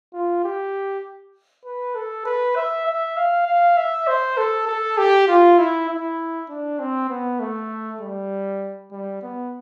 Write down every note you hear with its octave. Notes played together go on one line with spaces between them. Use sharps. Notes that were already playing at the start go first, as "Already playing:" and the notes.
F4
G4
B4
A4
B4
E5
E5
F5
F5
E5
C5
A4
A4
G4
F4
E4
E4
D4
C4
B3
A3
G3
G3
B3